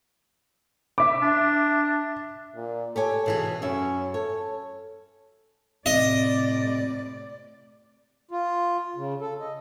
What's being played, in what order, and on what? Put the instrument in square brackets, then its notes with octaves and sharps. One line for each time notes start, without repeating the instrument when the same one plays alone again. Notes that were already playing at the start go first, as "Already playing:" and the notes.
[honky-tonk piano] E5 D6
[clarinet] D4
[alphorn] A#2
[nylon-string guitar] G4 C#5 G#5 [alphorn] A4
[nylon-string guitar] B2 E3 G#4
[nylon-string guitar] F#2 E5 [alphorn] C#4
[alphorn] A4 [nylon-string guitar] C#5
[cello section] A2 C3 D5 [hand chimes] C4 [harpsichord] D#5
[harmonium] F4
C#3
A4
D#5